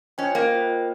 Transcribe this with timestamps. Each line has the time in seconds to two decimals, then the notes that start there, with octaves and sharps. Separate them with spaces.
0.18 C#4 F4 C5 D#5 G5
0.35 A#3
0.52 F4 C5 D#5 G5